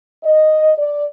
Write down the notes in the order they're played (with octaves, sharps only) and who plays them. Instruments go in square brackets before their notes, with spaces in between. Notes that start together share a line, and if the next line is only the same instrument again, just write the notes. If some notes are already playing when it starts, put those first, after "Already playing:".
[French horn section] D#5
D5